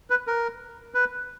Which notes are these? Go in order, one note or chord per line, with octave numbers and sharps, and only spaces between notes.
B4
A#4
B4